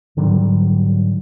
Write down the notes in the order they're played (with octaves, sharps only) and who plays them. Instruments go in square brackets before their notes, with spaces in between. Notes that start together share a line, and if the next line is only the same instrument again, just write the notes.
[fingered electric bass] G#2 D3 F#3 G3